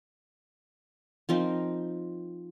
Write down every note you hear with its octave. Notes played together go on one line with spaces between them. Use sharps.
F3 C4 D#4 A#4